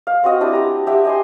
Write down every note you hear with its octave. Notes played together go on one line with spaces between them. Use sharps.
F5
C4 F#4 D#5 G5
D4 E4 G4 D5
G4 A#5
G4 E5 F#5
D#5 G#5 C6